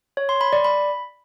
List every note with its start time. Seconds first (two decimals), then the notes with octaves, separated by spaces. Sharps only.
0.17 C#5
0.29 C6
0.41 B5
0.53 D5
0.64 B5